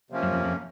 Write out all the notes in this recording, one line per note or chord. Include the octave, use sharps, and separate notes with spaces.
C3 F3 A#3 C#4
F#2
F2
F2